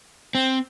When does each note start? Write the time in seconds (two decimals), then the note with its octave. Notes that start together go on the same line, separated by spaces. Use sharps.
0.35 C4